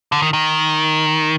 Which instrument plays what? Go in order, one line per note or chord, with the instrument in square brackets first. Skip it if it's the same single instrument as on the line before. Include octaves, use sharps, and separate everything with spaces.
[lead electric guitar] D3
D#3
D#3